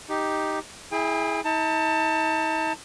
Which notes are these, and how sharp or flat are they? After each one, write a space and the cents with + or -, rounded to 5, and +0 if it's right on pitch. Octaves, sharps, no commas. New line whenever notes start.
D#4 +0 G4 +0
E4 -15 G#4 +10 G5 +45
D#4 +45 A5 +25